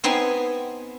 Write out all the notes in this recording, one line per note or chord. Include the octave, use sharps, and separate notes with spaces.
B3 C4 D#4 G#5 C6